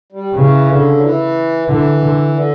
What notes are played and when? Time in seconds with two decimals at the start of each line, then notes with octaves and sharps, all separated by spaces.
0.12 G3
0.35 C#3 E3
0.68 D3
0.97 F#3
1.02 E3
1.68 D3 E3
2.01 D3
2.34 D3